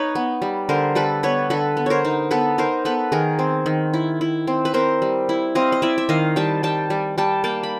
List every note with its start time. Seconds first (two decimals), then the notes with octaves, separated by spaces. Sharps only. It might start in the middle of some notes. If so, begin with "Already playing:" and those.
Already playing: D#4 B4 C#5
0.15 B3
0.42 G3
0.69 D3 A#4 C5
0.95 G3 A4 B4
1.23 B3 B4 C#5
1.50 D3 A4 B4
1.77 B3
1.86 A#4 C5 C#5
2.05 D#4
2.31 B3 A4 B4
2.58 D#4 A#4 C5
2.85 B3 A4 B4
3.12 D#3 G#4 A#4
3.39 C4
3.66 D#3
3.94 E4
4.21 E4
4.47 C4
4.65 B4
4.74 C4 A#4 C5
5.02 G3
5.29 E4
5.55 C4 D#5 F5
5.72 D#5
5.82 E4 D5 E5
5.98 E5
6.09 D#3 D#5 F5
6.36 G3 G5 A5
6.63 G3 G5 A5
6.90 G3
7.18 G3 G5 A5
7.44 A#3 G5 A5
7.63 B5